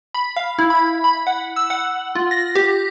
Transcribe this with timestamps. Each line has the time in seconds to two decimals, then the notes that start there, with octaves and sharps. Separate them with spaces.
0.14 B5
0.36 F5
0.59 E4
0.70 B5
1.04 B5
1.27 F#5
1.56 E6
1.70 F#5
2.15 F4
2.31 A#6
2.55 G4